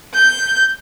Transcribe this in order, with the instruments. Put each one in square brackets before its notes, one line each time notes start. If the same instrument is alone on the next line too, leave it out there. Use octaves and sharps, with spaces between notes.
[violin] G6